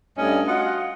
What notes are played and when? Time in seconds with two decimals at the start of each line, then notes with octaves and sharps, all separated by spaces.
0.17 G2 A3 C#4 D#5
0.47 F4 F#4 D#5 F#5